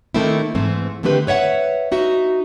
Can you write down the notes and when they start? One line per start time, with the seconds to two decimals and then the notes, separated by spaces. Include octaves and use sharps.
0.14 D#3 A3 A#3 C4 D#4 E4
0.55 G#2 E3 A3 C4
1.03 D3 D#3 A3 C4 G4 B4
1.27 B4 C#5 E5 F#5
1.92 D#4 F#4 E5